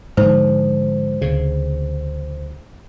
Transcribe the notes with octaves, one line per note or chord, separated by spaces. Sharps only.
G#2 D3 F3 C5
D2 C#3